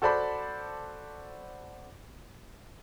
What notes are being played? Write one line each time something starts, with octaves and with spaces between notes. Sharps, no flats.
F#4 A4 C5 D5 A5 B5